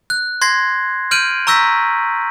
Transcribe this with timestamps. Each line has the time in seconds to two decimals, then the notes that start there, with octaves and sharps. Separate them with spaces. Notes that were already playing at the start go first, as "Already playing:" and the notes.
0.10 F#6
0.42 C6 G#6 A#6 C7
1.11 F6 G6 D7 D#7 F#7
1.47 A#5 C#6 E6 G6 A#6 B6